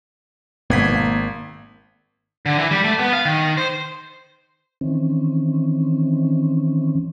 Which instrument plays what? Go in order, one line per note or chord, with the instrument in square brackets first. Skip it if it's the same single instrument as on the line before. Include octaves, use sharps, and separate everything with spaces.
[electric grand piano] G#1 G#6 B6 [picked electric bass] B2 A#3 B3
[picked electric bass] A#3
[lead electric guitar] D3
E3
G3
A3
B3
F5
D#3
C5
[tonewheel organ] D#3 E3 C4 C#4